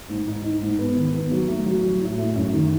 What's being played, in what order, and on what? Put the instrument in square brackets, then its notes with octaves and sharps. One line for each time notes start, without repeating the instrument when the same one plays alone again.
[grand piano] G#2
D#4
D#4
G#2
B3
D#3
B3
F#3
A3
F#3
F#3
A2
A3
F#2
D#3